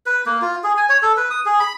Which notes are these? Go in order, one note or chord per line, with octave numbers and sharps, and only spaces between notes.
B4
A#3
F4
G#4
G#5
C#5
A4
B4
D#6
G#4
B5